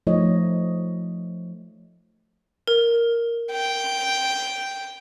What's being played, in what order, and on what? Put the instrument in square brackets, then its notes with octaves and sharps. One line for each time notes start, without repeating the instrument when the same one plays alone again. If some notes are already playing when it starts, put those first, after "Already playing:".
[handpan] F3 A3 D#4 C5 C#5 D#5
[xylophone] A#4
[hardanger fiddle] G5